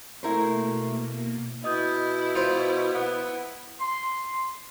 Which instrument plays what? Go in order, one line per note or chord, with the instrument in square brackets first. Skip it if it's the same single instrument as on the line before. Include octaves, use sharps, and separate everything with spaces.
[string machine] B2 A#3 [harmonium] A3 [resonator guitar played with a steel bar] E4 A#4 C5
[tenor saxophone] B2 [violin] E4 [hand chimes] D#5 D#6 G6
[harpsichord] F4 C5
[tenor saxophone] B3
[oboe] C6